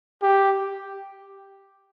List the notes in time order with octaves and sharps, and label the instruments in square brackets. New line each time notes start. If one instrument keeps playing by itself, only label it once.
[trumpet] G4